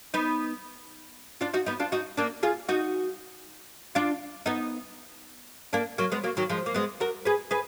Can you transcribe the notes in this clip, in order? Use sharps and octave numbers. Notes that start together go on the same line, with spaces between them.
B3 D#4
D4 F4
D#4 F#4
B3 D#4
D4 F4
D#4 F#4
A#3 D4
F4 G#4
D#4 F#4
D4 F4
B3 D#4
A#3 D4
F#3 A#3
G#3 B3
F#3 A#3
D#3 F#3
F3 G#3
A#3
G#3 B3
F#4 A#4
G#4 B4
G#4 B4